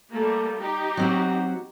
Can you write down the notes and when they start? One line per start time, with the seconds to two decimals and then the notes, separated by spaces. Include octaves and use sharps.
0.13 G3 A3 A#3
0.60 D#4 G4
0.97 F#3 C4 F#4